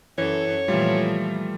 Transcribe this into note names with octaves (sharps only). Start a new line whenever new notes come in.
F#2 E3 A4 C#5
A#2 E3 F3 G3 A3 F4